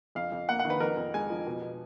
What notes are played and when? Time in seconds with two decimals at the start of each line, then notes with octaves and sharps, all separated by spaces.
0.15 F2 F5
0.32 F2
0.49 A#3 F#5
0.59 F#5
0.65 D#3
0.70 B4
0.80 F2 A#4
0.97 F2
1.14 G#3 G#5
1.30 F3
1.47 B2
1.62 B2